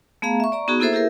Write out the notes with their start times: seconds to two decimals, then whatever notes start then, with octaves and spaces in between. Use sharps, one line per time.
0.22 A3 B3 G#4 F5 A#5
0.40 E5 C#6
0.52 D5 A#5 C#6
0.68 B3 D#4 F#4 G#4
0.80 A#3 E4 G#4 A4 C5 E5
0.93 E4 G4 G#4 A#4 E5